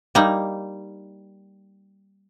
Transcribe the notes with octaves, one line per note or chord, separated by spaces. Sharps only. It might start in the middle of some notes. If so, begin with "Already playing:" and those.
G3 A#3 D#4